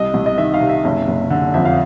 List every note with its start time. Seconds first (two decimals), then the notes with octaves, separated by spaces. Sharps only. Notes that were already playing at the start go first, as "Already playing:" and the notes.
Already playing: C2 D#5
0.14 C2
0.26 D#5
0.38 D#3 E5
0.54 F5
0.60 C3
0.69 E5
0.85 F#1
1.08 F#1
1.30 D3
1.54 F2 E5
1.65 F5